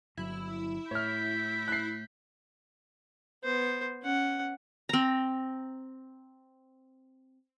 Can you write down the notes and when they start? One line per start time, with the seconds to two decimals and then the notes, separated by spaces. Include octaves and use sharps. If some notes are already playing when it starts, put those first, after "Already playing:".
0.17 G1 F#3 E4
0.91 A2 C#5 F6 G6 B6
1.68 F#6 C7
3.44 B3 C5
4.03 C#4 F#5
4.89 C4 A#5